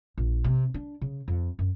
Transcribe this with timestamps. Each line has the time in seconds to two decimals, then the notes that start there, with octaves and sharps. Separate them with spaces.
0.18 A#1
0.44 C3
0.74 D4
1.01 C#3
1.28 F2
1.59 F#2